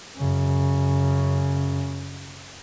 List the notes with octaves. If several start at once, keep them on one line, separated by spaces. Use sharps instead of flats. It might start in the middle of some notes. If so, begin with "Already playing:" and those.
F#2 C#3